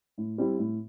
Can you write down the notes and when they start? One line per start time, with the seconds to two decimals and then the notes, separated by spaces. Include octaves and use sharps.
0.18 A2
0.38 G3 C4 E4
0.59 A2